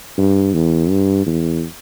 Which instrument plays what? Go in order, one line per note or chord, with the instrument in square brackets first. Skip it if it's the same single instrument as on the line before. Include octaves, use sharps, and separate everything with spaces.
[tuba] G2
E2
G2
E2